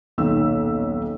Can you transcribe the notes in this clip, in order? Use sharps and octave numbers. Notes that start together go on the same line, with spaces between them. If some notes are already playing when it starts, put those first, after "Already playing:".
D#1 B1 D#3 E6